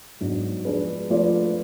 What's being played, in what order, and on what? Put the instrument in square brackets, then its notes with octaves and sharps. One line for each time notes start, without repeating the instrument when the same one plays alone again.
[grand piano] G#2 F#3 B3 D4 F#4
F3 G#3 D4 G#4 B4
F3 A3 F4 B4 D5